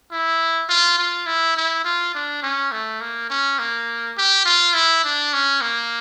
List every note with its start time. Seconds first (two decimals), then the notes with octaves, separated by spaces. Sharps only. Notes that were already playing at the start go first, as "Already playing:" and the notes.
0.12 E4
0.69 F4
0.98 F4
1.26 E4
1.56 E4
1.85 F4
2.15 D4
2.43 C#4
2.72 A3
3.01 A#3
3.30 C#4
3.59 A#3
4.17 G4
4.46 F4
4.74 E4
5.04 D4
5.33 C#4
5.61 A#3